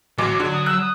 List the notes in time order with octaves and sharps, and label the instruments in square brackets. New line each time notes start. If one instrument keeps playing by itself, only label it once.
[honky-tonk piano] A1 D6 [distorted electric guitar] F#3
[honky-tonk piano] D3
[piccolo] D#6
[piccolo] E6 [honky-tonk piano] F#6
[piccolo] D#6